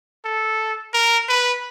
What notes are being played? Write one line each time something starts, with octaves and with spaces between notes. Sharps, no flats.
A4
A#4
B4